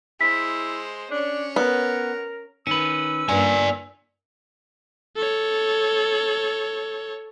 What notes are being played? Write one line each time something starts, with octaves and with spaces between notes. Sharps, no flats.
G#3 E4 C5 B6
C#4 D4 C#5
B3 A#4
D#3 C#4 B4 E6
G2 A#3 D5 G#5
A4 C#5